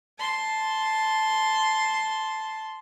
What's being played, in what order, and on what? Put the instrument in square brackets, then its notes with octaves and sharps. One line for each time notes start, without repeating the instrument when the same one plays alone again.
[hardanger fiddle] A5 C6